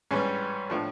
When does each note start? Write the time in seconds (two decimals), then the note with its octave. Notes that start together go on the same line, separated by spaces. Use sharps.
0.11 G#2 E3 G3 C#4
0.70 A2 F3 A3 D4